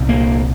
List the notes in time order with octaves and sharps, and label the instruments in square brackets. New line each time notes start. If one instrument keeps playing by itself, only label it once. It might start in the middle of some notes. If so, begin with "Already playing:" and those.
Already playing: [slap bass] C2 A#2
A#3